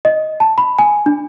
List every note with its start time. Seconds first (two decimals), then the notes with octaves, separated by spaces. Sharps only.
0.05 D#5
0.40 A5
0.58 B5
0.79 G#5
1.06 D4